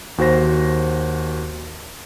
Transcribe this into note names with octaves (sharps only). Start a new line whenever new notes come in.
D#2 F#4 C5 A#6